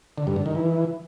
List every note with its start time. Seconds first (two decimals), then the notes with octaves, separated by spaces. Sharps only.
0.18 D3
0.27 G2
0.36 D3
0.46 D#3
0.55 E3